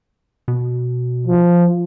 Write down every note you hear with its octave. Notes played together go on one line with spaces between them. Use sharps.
B2
F3